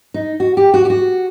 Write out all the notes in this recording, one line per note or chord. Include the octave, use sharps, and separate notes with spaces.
D#4
F#4
G4
F#4
G4
F#4